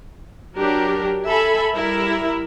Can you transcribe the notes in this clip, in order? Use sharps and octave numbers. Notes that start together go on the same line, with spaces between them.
F#3 D4 G4 A#4
A4 E5 G#5 B5
G3 E4 A#4 E5